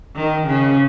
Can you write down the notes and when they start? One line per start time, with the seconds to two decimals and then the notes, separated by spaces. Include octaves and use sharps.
0.16 D#3
0.47 C#3